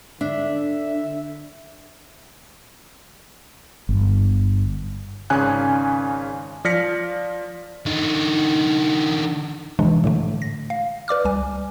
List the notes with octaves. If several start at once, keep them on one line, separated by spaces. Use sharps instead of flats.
D3 D4 E5
G1
G#1 C#3 C#4 G#5 F#6
F3 D5 F6 A#6 B6 C#7
D3 D#4
C3 E3 F3 G#3 D4
A2 D3 A3
A#6
F5
B4 D5 D6 F6
C#2 G3 G#5